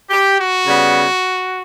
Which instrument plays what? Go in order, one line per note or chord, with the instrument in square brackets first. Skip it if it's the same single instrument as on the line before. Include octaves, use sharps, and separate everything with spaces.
[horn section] G4
F#4
C#3 G3 B3